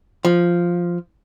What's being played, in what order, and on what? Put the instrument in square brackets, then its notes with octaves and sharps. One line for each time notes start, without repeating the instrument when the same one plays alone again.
[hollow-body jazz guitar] F3